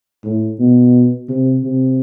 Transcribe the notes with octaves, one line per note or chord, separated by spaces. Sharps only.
A2
B2
C3
C3